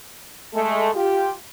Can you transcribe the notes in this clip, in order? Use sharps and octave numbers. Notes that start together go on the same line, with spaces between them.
G#3 A3
F4 G4